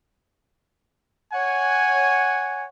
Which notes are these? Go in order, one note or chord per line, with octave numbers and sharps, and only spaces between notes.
C#5 F#5 G#5